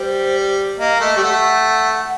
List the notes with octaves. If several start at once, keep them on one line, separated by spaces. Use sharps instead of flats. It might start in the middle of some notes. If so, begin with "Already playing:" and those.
Already playing: G3 C5
A#3 D#5
A3 D#5
G3
A3 F#5